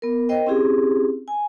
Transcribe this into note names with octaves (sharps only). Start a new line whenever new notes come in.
B3 A#4
A#4 C5 D#5 G5
C4 C#4 E4 G4 G#4
G#5